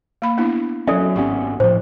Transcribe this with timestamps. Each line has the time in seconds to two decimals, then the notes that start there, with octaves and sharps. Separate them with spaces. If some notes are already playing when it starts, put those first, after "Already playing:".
0.22 A#3 B5
0.38 B3 D4 E4
0.87 F#3 C#4 A4 D5 E5
1.16 G#1 B3 C#4 G4
1.60 A2 F3 C5